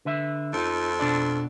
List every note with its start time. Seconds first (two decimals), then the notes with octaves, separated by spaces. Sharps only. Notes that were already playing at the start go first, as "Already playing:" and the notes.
0.05 D3 B4 E5
0.53 F2 D#4 F4
0.99 B2 D4 D5